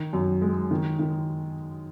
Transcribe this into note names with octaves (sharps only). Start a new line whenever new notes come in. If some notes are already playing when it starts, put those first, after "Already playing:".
Already playing: D#3
F#2
G#3
D#3
D#3